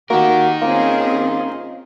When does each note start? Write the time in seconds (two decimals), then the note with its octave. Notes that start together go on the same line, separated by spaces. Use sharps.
0.10 A#3 D#4 F#4 G4 A#4
0.62 A#3 C4 C#4 F4 G#4